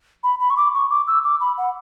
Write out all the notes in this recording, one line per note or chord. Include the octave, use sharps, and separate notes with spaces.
B5
B5
C#6
D6
C#6
D6
E6
D6
B5
F#5